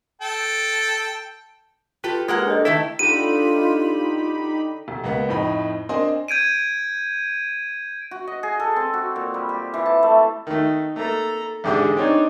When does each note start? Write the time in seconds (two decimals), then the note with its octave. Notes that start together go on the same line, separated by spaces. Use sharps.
0.22 A4 G5
2.04 F4 G4 A4 B4
2.28 G#3 A#3 G4 A#4 B4 F#5
2.46 D4 A4 D5 D#5
2.65 D#3 A3 E4 A4 E5
2.99 D3 D#4 F4 G4 B5 D#7
4.88 F1
5.04 C#2 A#3 B3 F#5
5.28 F2 A2 C4 D#4 B5
5.89 C4 D4 A#4 D#5 G#5 C6
6.28 G6 G#6 D7 D#7
8.11 F#4
8.27 D#5
8.43 G#4
8.60 A4
8.76 C4
8.94 F#4
9.16 A#2
9.34 G3
9.49 G4
9.74 E3
9.86 A5
10.03 A3
10.47 D#3 A3 D#4
10.96 A3 A#3 A4 A#5
11.64 A1 G#2 D3 G4 G#4
11.96 C4 D4 D#4 C#5